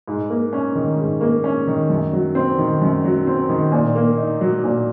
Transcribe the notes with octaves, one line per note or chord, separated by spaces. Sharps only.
G#2
A#3
C#4
D#3
G#2
A#3
C#4
D#3
F#2
F#3
C4
D#3
F#2
F#3
C4
D#3
A#2
A#3
D#4
F#3
A#2